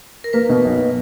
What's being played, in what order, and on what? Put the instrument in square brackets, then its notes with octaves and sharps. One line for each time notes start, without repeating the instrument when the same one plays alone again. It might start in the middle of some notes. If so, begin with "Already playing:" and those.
[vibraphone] A#4
[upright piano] A#3 [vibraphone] B4
[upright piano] B2
B1